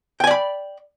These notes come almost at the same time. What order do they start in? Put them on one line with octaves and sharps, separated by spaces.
G5 G#5 D5 B5